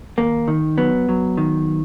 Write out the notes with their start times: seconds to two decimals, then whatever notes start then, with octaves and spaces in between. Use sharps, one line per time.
0.18 D#2 A#3
0.48 D#3
0.78 F#3 B3
1.09 F#3
1.37 D#3